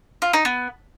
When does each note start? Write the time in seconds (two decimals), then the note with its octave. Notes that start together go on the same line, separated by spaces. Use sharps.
0.22 F4
0.33 D#4
0.45 B3